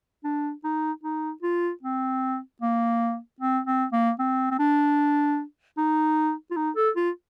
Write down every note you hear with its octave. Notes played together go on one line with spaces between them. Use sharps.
D4
D#4
D#4
F4
C4
A#3
C4
C4
A#3
C4
C4
D4
D#4
F4
D#4
A4
F4